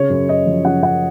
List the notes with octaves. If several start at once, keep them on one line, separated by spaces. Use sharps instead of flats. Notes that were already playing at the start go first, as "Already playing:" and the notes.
Already playing: C#3 C#5
F#2
F#2 D#5
F3
C#3 F#5
F#2 F#5